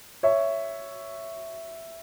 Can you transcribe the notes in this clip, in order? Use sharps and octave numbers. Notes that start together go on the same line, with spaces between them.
C#5 E5